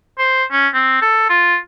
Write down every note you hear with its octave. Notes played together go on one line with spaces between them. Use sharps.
C5
C#4
C4
A4
F4